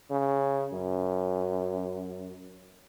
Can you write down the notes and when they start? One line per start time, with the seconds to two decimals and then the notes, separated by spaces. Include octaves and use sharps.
0.11 C#3
0.73 F#2